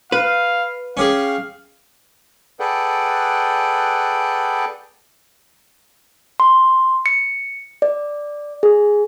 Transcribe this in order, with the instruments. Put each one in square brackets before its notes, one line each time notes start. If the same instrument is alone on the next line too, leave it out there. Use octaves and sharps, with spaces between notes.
[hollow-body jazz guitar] B4 [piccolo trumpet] F5
[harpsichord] C#4 G4 G#4 [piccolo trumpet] F5
[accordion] G#4 A4 B4 D5 F#5 G5
[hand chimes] C6
C#7
D5
G#4